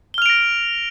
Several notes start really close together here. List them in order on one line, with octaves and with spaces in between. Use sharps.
G7 F6 F7 D7 A#6